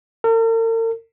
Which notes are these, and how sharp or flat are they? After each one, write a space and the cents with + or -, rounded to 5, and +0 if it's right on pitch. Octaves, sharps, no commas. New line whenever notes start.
A#4 -45